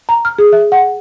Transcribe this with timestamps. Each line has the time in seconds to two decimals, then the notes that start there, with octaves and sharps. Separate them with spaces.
0.09 A#5
0.25 F6
0.39 G#4
0.53 E5
0.72 F#5